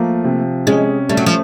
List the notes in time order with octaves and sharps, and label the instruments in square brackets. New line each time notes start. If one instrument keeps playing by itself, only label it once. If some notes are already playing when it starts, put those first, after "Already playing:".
Already playing: [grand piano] F3 A3 [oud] A#3
[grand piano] C3
[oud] G#3 [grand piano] C#4
[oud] G3 [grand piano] A3
[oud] F#3
F3